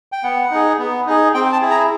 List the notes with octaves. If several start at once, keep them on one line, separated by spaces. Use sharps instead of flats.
G5
B3 F#5
D#4 G#4
B3
D#4 G#4
C4 G5
A5
E4 G#4
A#5